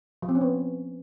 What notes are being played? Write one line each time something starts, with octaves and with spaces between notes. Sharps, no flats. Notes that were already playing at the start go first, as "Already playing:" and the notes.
F3
C4
C#4
B3